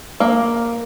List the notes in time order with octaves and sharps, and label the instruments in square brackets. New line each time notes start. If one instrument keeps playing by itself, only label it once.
[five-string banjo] A#3